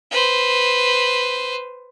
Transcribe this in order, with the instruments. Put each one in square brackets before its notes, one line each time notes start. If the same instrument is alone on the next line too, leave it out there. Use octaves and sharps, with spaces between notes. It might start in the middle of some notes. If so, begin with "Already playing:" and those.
[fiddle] B4 C5